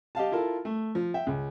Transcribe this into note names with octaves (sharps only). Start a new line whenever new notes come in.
G4 D#5 F5 A5
E4 F4 A4 A#4
A3
F3
E5 G5
C#2